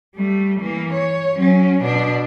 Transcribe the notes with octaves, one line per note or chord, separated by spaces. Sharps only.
G3 A3
E3 A#3
C#5
F#3 C#4
B2 D4